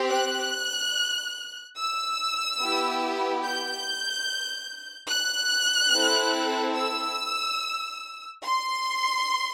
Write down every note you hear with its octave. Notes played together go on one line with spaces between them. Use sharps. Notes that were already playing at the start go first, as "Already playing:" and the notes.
Already playing: C4 G4
F#6
E6
B3 E4 G4
G6
F#6
C4 E4 A4
E6
C6